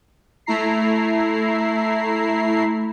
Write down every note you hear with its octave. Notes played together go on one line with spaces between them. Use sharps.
A3 E4 A#5 C7